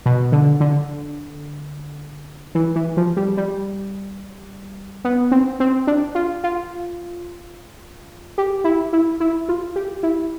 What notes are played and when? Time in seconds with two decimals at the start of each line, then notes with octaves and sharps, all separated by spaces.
0.06 B2
0.32 D3
0.60 D3
2.55 E3
2.76 E3
2.97 F3
3.17 G3
3.37 G3
5.05 B3
5.31 C4
5.60 C4
5.87 D4
6.15 F4
6.44 F4
8.38 G4
8.64 E4
8.93 E4
9.20 E4
9.49 F4
9.76 G4
10.03 E4